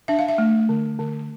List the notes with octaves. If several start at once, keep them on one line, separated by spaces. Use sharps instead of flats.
D4 E5
F5
E5
A3
D3
D3